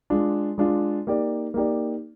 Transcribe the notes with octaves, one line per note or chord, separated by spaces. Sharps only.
G#3 D4 F4
G#3 D4 F4
A#3 D#4 G4 D5
A#3 D#4 G4 D5